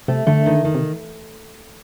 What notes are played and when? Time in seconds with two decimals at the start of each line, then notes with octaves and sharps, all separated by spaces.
0.08 C3 A3
0.27 D3 A3
0.46 D#3
0.65 D#3
0.74 C3